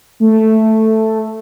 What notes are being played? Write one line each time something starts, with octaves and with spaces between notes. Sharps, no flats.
A3